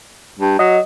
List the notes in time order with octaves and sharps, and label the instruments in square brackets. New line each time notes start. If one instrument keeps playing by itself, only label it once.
[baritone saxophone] G2
[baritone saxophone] F#3 [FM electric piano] D#5